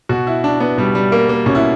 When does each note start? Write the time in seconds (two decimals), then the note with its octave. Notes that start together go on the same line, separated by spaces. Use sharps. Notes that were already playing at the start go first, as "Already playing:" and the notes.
0.09 B2 F#4
0.27 E4
0.44 D4
0.60 B3
0.78 B2 G3
0.95 G3
1.12 A#3
1.29 A#3
1.46 B2 C#4
1.55 E4